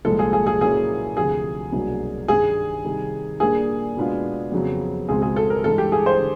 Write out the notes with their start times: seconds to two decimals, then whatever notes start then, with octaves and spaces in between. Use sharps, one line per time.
0.05 C2 A#2 F3 G#3 A4
0.19 G#4
0.33 G#4
0.47 G#4
0.61 A#2 F#3 A#3 C#4 E4 G#4
1.17 D2 C3 F3 G#4
1.72 C2 B2 F#3 A#3 D4
2.28 G2 D#3 G3 G#4
2.84 C3 D#3 G3
3.40 A#2 G3 A#3 D4 G#4
3.96 B2 G#3 B3 D4 F4
4.52 F2 C#3 F#3 B3
5.09 C#2 B2 G#3 C4 G#4
5.22 G#4
5.36 A4
5.50 A#4
5.64 G2 E3 G#3 A4
5.78 G4
5.92 G#4
6.06 C5
6.20 D3